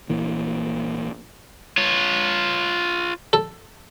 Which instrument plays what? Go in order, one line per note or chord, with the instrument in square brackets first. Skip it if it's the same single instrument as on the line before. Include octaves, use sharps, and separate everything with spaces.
[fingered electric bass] A#1 A#2 E3
[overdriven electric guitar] F4 C#5
[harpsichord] A4